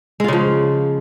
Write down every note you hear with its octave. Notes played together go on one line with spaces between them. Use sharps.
C#3 F3 G#3 F4